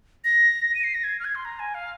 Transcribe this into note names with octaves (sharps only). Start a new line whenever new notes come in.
A#6
D#7
C7
A#6
G#6
F6
G#6
C6
A#5
G#5
F5